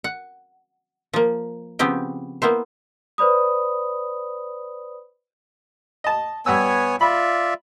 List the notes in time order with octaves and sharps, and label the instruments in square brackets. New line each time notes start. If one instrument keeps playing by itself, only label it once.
[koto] F#5
F3 A#3
C#3 F3 B3 C4 G4 G5
A#3 B3 E4 C5
[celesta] B4 C5 D5 B5 D#6
[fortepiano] D#5 A5
[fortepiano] G2 F#5 E6 [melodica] B3 C#5 G#5
[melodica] F4 D5 E5 [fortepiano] B5